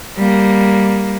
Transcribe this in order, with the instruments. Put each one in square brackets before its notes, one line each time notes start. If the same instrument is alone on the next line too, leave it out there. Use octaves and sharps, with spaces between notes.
[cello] G3 A#3